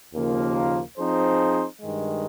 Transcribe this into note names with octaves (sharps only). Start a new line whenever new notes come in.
D#2 C#3 F3 A#3 F4
F3 C4 D#4 G#4 C5
G2 D#3 G#3